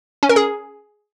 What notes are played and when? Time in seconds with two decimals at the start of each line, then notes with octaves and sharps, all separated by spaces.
0.23 C#4
0.29 A#4
0.36 G#4